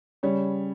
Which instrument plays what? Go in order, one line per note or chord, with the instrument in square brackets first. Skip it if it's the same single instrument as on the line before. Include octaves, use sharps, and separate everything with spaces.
[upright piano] C#3 G3 C#5